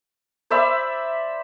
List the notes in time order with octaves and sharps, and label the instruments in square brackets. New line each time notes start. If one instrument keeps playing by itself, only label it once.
[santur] C5 D5 E5 B5